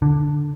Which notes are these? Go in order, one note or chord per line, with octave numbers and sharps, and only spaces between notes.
D3